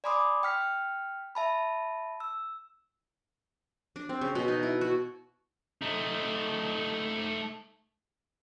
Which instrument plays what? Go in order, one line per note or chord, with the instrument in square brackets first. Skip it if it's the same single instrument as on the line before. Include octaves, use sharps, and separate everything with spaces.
[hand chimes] D5 G#5 B5 C6 D6 D#6
G5 F6 B6
E5 A5 B5
E6
[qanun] D4
C4
C#3
B2
D#4
E4
F#4
[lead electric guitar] A3 D#4